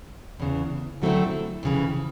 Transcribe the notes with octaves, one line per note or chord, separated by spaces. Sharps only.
E2 C#3 E3
D3 F#3 A3 C4 E4
F2 C#3 E3